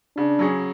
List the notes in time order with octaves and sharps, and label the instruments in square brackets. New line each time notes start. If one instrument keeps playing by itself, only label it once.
[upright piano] C#3 [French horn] D4
[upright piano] F#3 C#4 G#4